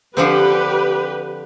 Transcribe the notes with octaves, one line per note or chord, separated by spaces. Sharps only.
D3 F3 C4 G4 B4